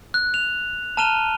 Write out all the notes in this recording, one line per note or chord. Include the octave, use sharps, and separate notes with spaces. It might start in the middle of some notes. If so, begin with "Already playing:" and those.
F#6
F7
A5 A#5 F6 D#7 F7 G7